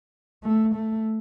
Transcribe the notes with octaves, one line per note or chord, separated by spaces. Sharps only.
A3
A3